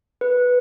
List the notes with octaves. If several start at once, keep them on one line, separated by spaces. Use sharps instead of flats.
B4